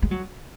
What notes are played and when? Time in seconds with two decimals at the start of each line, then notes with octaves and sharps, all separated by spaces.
0.02 G#3
0.11 F#3